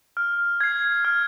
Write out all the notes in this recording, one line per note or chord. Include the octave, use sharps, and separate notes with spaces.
F6
G#6 C7
F6